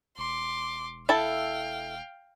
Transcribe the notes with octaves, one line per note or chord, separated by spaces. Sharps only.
E1 C6 D6
E4 A4 F5 G5 A5